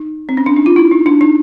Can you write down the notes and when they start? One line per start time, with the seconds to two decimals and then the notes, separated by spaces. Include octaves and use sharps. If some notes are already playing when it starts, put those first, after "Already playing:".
Already playing: D#4
0.29 C4
0.37 C#4
0.46 D4
0.56 D#4
0.66 F4
0.76 E4
0.91 D#4
1.06 D4
1.21 D#4